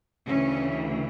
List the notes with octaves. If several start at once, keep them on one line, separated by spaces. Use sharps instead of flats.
D2 C#3 E3 C#4